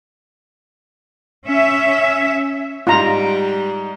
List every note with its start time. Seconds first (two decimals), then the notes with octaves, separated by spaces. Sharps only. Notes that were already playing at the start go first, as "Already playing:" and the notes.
1.46 C#4 E5
2.87 G#2 G3 F4 A#5